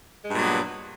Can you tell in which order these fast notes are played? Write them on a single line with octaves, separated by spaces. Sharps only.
G#3 G2 A#2 F#3 B3